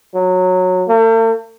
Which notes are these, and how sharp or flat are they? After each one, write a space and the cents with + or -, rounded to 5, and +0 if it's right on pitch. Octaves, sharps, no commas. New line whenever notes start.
F#3 -15
A3 +45